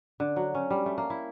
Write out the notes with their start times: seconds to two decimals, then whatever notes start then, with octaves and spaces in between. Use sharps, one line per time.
0.20 D3
0.36 F#3
0.55 C#4
0.70 G3
0.86 A3
0.98 A#3
1.10 E4